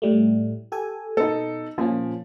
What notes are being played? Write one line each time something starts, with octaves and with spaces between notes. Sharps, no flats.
A2 G3 A3
G4 A4 G#5
B2 D#4 A4
A#2 F3 C#4